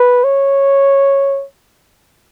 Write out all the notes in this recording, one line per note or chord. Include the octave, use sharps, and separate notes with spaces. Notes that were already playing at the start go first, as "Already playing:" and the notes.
Already playing: B4
C#5